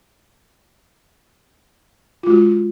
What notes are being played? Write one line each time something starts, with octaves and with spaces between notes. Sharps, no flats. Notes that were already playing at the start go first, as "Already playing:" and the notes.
G#3 F4 F#4